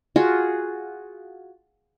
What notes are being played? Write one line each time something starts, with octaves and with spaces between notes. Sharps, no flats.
F4 F#4 G#4